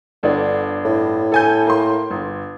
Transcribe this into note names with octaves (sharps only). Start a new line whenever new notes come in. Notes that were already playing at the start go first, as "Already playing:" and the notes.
G1 D3 D4
A2
A4 G#5 G6
A#3 C6
G1